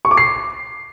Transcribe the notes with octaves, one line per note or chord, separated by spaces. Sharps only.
C#6
D6
C7